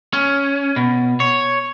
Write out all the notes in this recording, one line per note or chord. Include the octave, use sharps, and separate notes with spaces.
C#4
B2
C#5